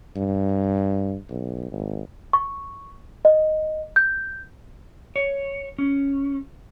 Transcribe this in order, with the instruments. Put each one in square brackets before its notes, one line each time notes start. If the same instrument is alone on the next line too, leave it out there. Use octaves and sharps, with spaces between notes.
[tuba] G2
B1
G#1
[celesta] C#6
D#5
G6
[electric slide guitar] C#5
C#4